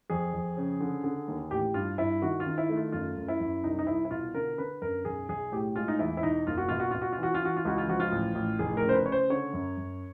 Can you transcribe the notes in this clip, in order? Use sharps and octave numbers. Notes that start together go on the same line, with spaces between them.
F2 G#4
F2
C#3
D3
D3
D#2
A1 G4
G2 F4
G2 E4
D#3 F#4
F4
D#3
E4
A3
F4
F#2 F4
F#2
E4
F#2
C2 D#4
D#4
C2 E4
E4
B2 F4
D3 A#4
D3 B4
F#2 A#4
B1 G#4
B1 G#4
A2 G4
G#3 F4
D#4
E2 E4
E4
B2 D#4
F#1 F4
F#4
B2 F4
F#4
B2 F4
F#4
F4
E3 F#4
F4
E3 F#4
F4
C#2 F#4
F4
F3 F#4
F4
A1
A1
F1 G#4
A#4
C#3
C5
B4
C#3 C#5
C5
D3 C#5
F#2
F#2